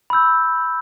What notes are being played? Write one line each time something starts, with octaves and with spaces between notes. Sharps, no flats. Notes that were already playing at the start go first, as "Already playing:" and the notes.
B5 E6 G6